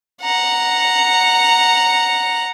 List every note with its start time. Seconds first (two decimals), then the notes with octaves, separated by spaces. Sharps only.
0.22 F#5 A#5